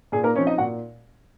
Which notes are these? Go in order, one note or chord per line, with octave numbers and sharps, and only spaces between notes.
A#2 G#4
A#3 A#4
F3 C4 C#4 D#4 C#5
D#4 D#5
A#2 F#4 F#5